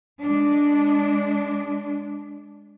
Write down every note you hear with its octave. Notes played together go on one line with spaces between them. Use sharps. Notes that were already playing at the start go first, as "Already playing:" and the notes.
G#3 D4